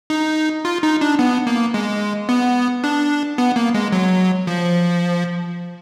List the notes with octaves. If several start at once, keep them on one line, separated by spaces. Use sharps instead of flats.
D#4
F4
D#4
D4
B3
A#3
G#3
B3
D4
B3
A#3
G#3
F#3
F3